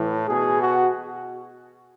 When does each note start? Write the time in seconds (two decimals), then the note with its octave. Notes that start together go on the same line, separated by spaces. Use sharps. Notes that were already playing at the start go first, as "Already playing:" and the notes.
Already playing: A2 E3
0.28 B2 G#4
0.59 F#4